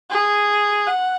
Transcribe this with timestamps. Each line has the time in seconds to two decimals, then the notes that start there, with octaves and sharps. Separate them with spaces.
0.11 G#4
0.87 F#5